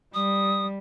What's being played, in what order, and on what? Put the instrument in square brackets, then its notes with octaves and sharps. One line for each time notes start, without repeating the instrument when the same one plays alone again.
[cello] G3 [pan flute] D#6